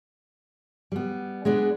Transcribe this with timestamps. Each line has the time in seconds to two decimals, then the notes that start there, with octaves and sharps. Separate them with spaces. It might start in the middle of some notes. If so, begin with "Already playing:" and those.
0.92 G3 B3
1.45 G#3 B3 D4